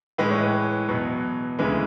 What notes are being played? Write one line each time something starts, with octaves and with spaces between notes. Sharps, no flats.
A2 E3 G#3 B4
C#5
B4
E2 B2 F#3 B4
D2 C#3 E3 G#3 B4